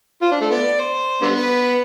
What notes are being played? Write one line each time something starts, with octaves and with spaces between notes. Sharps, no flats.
F4 C5
D4
A3
B3 D5
C5
D3 G3 B3
B4